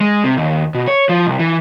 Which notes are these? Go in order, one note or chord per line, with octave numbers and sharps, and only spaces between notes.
G#3
C3
D#2
B2
C#5
F3
C2
E3